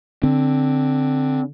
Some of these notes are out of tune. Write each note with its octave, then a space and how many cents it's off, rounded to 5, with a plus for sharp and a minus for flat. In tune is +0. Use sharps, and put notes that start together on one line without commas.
D3 +0 C4 +0